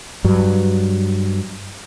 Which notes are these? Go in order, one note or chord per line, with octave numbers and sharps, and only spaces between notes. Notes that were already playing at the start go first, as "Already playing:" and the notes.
G2 F#3